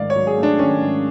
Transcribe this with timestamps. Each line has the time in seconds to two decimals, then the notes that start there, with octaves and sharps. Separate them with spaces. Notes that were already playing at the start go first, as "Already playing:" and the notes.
Already playing: G#2 D#3 F#3 A3 D5 F5
0.10 C#5
0.16 F#3
0.27 G#4
0.38 A3
0.43 D4
0.59 D#3 C#4
0.81 G#2